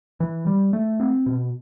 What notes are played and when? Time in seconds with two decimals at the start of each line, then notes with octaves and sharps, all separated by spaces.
0.20 E3
0.47 G3
0.73 A3
1.00 C4
1.26 B2